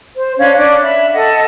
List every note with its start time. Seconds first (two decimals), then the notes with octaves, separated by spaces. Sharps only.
0.16 C5
0.39 C#4 D4 F5 G#6
0.58 C#4 D4 D5 D6
0.83 E5 B5
1.13 A4 D#5 F#5